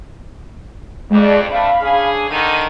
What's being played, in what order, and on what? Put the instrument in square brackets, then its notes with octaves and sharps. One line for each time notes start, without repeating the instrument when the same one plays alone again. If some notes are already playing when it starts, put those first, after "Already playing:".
[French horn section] F2 [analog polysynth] G#3 D5
[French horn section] A3 C4 D4 [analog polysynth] F5 B5
[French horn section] C#4 D4 G#4
[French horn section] D3 D#3 [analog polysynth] D#7